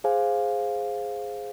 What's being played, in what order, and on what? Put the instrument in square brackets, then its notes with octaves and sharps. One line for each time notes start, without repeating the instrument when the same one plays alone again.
[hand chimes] G#4 C5 F5 G#5